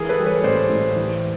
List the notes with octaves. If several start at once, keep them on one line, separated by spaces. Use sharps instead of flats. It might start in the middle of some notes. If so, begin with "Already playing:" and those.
Already playing: E3 G#4 A#4
A4 B4
G3
B4 C#5
A2 C5 D5
A2
E3